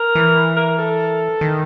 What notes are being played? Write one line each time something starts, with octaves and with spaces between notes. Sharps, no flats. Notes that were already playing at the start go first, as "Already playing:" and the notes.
Already playing: A#4
E3
A#4
A4
D#3